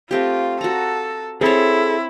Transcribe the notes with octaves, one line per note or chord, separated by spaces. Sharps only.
A3 C4 F4 G4
F#4 A4 A#5
C4 E4 G#4 A4 C#5